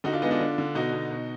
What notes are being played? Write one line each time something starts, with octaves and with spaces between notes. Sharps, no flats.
D3 D#4 F#4
D4 F4
G#3 B3 D#4
D4 F4
D3
D3
B2 D#4 F#4
B2
B2